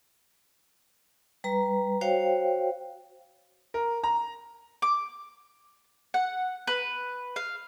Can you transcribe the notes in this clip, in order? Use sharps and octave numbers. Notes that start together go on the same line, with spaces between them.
G3 B4 A#5
F#4 C5 C#5 F5 G5
A#4
A#5
D6
F#5
B4
F5